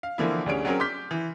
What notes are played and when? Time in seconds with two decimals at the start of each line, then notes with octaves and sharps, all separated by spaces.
0.03 F5
0.18 D3 E3 F3 A#3 D4 E4
0.46 D2 G3 C#4 G#4 C#5 D7
0.65 F#3 C4 C#4 G#4 A#4
0.80 C6 D6 F6 G6 B6
1.11 E3